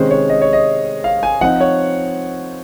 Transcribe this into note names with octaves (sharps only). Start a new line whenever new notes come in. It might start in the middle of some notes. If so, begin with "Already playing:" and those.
Already playing: C3 D#3 G#3 C#4 C5
C#5
D#5
C#5
D#5
F5
G#5
F3 C4 D#4 F#5
C#5